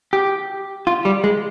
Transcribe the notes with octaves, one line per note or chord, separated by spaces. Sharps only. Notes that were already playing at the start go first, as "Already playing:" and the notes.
G4
F4
G3
G#3